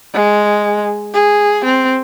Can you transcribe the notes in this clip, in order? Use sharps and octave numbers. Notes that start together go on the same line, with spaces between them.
G#3
G#4
C4